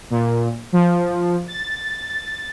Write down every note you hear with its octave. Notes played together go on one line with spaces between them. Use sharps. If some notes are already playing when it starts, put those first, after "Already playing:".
A#2
F3
A6